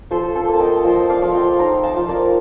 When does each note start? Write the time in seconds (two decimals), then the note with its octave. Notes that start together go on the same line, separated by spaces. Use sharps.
0.11 F3 A4 C5
0.35 A4 C5
0.48 A#3
0.53 A5
0.60 D#5 G5
0.77 A5
0.84 F3 D#5 G5
1.10 D5 F5
1.22 F3
1.34 D#5 G5
1.59 D#4 G5 A#5
1.83 F5 A5
1.96 F3
2.09 A#4 D5